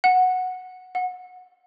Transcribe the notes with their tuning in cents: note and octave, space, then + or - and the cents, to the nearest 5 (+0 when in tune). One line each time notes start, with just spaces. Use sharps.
F#5 -5
F#5 -20